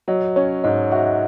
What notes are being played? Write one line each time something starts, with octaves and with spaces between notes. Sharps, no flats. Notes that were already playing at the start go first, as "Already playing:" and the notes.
F#3 D#5
C#4 C#5
G#2 D#5
F#4 E5